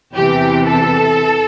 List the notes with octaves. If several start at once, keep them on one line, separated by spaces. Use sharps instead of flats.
E2 C3 E3 G4
A4